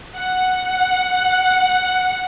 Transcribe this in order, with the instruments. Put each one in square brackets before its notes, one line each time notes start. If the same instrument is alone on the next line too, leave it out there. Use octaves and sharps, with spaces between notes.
[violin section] F#5